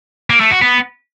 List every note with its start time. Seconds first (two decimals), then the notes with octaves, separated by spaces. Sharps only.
0.30 A#3
0.40 A3
0.51 F#4
0.61 B3